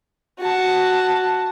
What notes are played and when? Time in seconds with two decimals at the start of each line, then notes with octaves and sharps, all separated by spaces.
0.40 F#4 A5